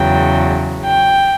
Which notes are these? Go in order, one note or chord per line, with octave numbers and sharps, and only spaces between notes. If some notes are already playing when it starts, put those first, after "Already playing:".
Already playing: E2 C#3 F#3 G5
G5